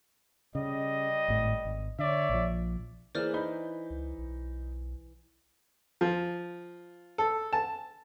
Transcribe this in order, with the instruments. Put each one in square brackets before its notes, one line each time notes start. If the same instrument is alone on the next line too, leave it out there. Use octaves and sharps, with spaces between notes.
[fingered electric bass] C#3 [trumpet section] G3 D#5
[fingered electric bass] G#1 A2
G#1
[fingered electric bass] D3 [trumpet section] C#5 D5 E5
[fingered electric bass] A#1 F3
[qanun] E3 B4 E5 [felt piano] A#3 G#4 [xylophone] C5 D5 F6
[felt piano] D#4 B5 G6
[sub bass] C#2
B1
[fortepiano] F3
A4
A5